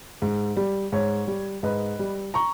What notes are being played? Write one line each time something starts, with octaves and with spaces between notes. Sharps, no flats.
G#2
G3
G#2 C#5
G3
G#2 B4 D#5
G3
A#5 C#6